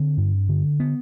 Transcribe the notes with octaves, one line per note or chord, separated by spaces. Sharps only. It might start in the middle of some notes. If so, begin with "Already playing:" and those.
Already playing: D3 C4
G2
D3
B3